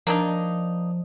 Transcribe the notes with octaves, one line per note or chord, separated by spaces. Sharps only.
F3 A#3 D4 D#4